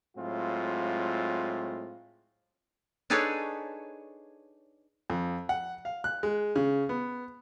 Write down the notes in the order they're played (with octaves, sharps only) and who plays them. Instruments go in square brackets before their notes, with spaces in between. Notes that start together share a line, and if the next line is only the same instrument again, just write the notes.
[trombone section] A2 F#3 G#3 C4 F4
[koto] D4 D#4 G#4 A4 B4 C#5
[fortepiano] F2
F#5
F5
F#6
G#3
C#3
B3